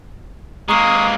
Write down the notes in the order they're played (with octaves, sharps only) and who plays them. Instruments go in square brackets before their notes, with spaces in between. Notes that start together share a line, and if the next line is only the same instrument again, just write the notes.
[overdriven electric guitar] G#3 A#3 [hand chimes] A#5 C#6 C7 [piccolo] D#6